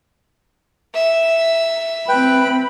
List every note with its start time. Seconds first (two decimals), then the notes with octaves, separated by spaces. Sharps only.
0.94 E5
2.09 C4 B4 G5 B5